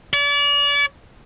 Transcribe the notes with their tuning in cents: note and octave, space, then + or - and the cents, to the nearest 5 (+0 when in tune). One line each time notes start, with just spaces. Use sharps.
D5 -40